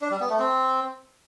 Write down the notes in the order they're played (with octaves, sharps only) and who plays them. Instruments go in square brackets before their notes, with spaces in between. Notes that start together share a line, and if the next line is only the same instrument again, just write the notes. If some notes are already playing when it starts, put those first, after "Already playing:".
[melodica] D4
G3
B3
A3
C4